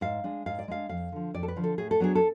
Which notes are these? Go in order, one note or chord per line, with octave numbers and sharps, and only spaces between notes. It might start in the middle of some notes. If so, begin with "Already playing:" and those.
G#2 F5
G#3 D4
G#2 F5
D5
G#3 D4 F5
F2 F5
D3 F3
F2 D5
A4
B4
D3 F3
A4
A2 G#4
A4
F#3 B3 D4 G#4
A4